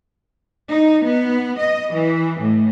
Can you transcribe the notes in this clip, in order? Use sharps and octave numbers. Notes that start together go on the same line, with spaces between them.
D#4
B3
D#5
E3
A2